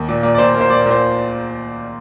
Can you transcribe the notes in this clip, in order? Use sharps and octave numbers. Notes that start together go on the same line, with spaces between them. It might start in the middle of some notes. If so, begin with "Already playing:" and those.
Already playing: D#2
A#2
A#2
D5
A#2 C5
A#3
C5
A#2 D5
A#2
C5